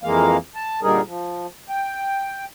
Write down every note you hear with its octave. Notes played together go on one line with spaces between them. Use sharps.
F2 E3 G#3 A#3 F5
A5
A#2 D3 G3 D#4 G#4 A#4
F3
G5